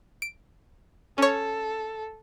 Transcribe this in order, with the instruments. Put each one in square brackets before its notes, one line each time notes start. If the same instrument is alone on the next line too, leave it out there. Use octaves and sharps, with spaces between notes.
[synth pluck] D7
[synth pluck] C#4 C#5 [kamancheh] A4